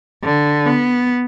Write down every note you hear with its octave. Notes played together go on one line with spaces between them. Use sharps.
D3
B3